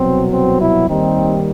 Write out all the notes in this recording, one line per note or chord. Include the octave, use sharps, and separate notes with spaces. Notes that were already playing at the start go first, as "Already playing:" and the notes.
Already playing: C2 B2 F#3 C4
C4
E4
D#2 D#3 G3 C4 D#4